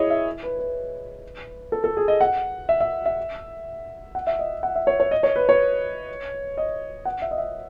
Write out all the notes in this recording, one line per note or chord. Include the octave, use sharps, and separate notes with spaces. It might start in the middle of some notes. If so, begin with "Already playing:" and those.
Already playing: E4 G#4 C#5 D#5
E5
B4
B4
A4
A4
G#4
D#5
F#5
E5
E5
E5
F#5
E5
D#5
F#5
E5
C#5
C#5
D#5
C#5
B4
C#5
D#5
F#5
E5
D#5
E5